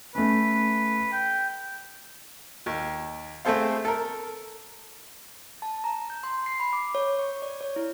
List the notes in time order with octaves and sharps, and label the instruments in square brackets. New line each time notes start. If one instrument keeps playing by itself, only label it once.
[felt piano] A3 C#4 [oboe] B4
[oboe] G5
[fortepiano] D#2
A3 C4 G#4 A4 C5 F5
A4 A#4
[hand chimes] A5
A#5
G6
C6
C7
B5
D6
C#5
C#6
D5
C#5
E4